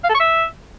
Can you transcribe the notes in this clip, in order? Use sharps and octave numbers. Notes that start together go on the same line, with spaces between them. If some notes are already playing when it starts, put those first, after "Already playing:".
F5
A4
C#6
E5